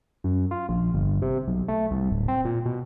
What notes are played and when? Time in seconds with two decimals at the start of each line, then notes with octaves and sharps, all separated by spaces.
0.24 F#2
0.51 F4
0.69 A#1
0.94 G1
1.22 C3
1.48 B1
1.68 A3
1.91 C2
2.11 D1
2.28 C4
2.45 A#2
2.65 B2